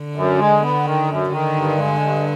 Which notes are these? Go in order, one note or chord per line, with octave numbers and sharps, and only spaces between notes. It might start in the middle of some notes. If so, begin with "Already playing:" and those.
Already playing: D3
F#2
G#3
B3
D#3
F#2
D3 D#3
G2
G#3
G2